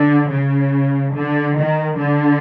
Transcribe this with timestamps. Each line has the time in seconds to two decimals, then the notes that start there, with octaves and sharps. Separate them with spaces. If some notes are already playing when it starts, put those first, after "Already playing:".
Already playing: D3
0.31 C#3
1.15 D3
1.57 D#3
1.99 D3